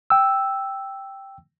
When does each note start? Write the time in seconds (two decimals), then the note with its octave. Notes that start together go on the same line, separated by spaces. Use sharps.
0.10 G5 E6